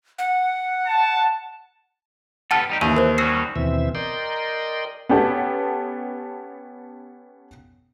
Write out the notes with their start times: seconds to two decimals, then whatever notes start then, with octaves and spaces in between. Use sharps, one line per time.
0.19 F#5
0.87 A5
2.51 B3 G4 A4 F#5 A5 F6
2.69 G3 D#4 G4
2.81 D#2 E3 D#7
2.97 A#4 C5
3.18 G3 C#4 F#4 E6 C7
3.56 D#2 B2 E3 C4 E5
3.95 A#4 D5 D#5 G5 C6
5.09 B3 C#4 G4 A4